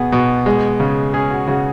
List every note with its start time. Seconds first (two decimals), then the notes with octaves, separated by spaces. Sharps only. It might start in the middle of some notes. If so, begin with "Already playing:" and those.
Already playing: B2 B3 F#4 G#4
0.12 B2
0.46 G#3
0.80 C#3
1.14 C#4 G#4
1.31 F#4
1.48 C#3 F#4